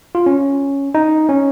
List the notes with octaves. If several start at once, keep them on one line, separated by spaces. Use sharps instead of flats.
F4
C#4
D#4
C#4